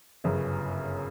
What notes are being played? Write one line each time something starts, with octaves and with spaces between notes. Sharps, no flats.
G1 F#2 C#3